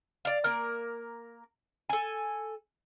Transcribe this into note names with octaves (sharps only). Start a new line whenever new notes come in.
D5 F5
A#3 A#4
A4 G#5